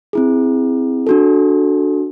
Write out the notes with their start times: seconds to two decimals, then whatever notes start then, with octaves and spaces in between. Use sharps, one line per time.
0.13 C4 E4 G#4
1.07 D4 F#4 A4